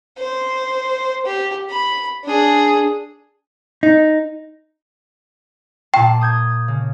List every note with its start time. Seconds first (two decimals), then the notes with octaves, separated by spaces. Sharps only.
0.19 C5
1.26 G4
1.70 B5
2.25 D4 G#4
3.83 D#4
5.94 A#2 D5 G5 A5
6.21 D#6 G6 G#6
6.68 C#3